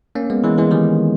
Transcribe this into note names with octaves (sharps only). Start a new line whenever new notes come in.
A#3 C#4
G#3 B3
E3 G#3
E3 G#3
D#3 G3